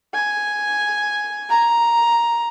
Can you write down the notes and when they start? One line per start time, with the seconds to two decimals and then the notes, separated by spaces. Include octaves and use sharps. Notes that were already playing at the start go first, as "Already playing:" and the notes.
0.14 G#5
1.50 A#5